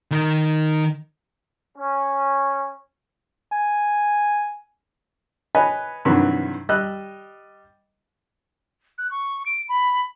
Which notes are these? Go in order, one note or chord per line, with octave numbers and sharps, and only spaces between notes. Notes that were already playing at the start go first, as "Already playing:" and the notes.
D#3 A#4
C#4
G#5
B4 C#5 D#5 G#5 B5
G2 C3 D#3 E3 F#3
G3 D#5 E6 F#6
F#6
C#6
D7
B5